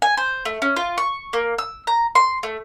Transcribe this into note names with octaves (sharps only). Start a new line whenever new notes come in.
G#5
C5
A3
C#4
F4
C#6
A#3
E6
A#5
C6
A3